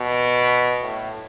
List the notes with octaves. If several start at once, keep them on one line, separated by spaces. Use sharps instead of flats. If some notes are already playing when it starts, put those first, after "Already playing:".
Already playing: B2
A2